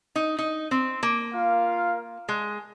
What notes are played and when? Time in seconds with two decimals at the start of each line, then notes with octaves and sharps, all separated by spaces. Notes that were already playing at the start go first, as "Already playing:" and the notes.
0.16 D#4
0.39 D#4
0.71 C4
1.03 A#3
1.33 F4 A#4 F5
2.29 G#3